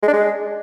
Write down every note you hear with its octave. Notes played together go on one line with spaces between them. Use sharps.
G#3
D4
G#3